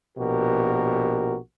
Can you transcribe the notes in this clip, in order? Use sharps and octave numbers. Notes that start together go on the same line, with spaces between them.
A#1 B2 F#4 G4 A#4